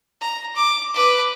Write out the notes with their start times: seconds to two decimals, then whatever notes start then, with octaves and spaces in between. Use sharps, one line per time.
0.21 A#5
0.56 D6
0.94 B4 D6